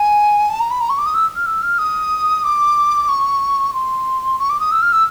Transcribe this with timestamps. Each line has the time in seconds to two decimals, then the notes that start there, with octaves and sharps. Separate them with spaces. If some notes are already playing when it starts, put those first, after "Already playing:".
Already playing: G#5
0.49 A5
0.60 A#5
0.71 B5
0.81 A#5
0.89 C#6
0.98 D6
1.06 D#6
1.14 E6
1.36 F6
1.46 E6
1.62 F6
1.78 D#6
2.44 D6
3.08 C#6
3.74 C6
4.39 C#6
4.50 D6
4.60 D#6
4.71 E6
4.82 F6
4.92 E6